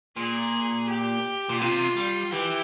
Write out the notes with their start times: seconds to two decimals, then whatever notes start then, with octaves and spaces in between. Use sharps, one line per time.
0.16 A#2 G#4
0.89 G4
1.49 A#2
1.60 C3 F4
1.96 G3
2.33 E3 G4